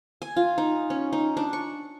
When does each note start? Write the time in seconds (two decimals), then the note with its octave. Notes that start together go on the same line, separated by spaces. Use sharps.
0.22 G#5
0.37 F4
0.58 D#4
0.90 C#4
1.13 D#4
1.37 D4
1.53 C#6